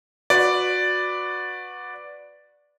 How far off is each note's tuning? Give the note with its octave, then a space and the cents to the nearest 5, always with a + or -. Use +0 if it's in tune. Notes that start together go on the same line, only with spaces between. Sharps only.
F#4 -20 B4 +5 D5 +0